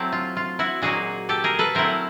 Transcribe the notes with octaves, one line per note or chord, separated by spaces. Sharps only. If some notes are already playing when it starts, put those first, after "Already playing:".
Already playing: F#3 A3 C4 E4
F4
F4
E4 F#4
A#2 F#3 A#3 D#4 F#4 G#4
G4 A4
G#4 A#4
A4 B4
F#3 A3 C4 E4 A#4 C5